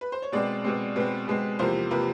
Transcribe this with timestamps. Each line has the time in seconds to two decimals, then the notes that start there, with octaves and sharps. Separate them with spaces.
0.01 B4
0.12 C5
0.22 C#5
0.32 B2 G#3 C4 D5
0.64 B2 G#3 C4
0.96 B2 G#3 C4 B4
1.28 B2 G#3 C4
1.59 E2 C3 F3 A#3 C5
1.91 C3 F3 A#3 B4